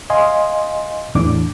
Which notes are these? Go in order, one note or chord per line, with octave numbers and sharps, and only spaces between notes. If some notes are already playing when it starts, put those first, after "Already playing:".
D#5 F5 G#5 C6
E2 A2 E3 D4 D6